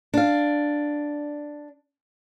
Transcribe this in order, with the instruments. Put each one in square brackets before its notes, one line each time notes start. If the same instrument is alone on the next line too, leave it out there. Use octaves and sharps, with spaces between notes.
[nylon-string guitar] D4 F5